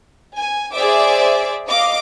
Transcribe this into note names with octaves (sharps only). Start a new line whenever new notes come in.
G#5
G#4 C5 D5 E5 D6
D#5 F5 D6